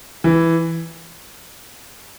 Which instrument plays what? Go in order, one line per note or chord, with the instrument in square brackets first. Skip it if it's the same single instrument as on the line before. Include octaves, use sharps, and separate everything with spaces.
[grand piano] E3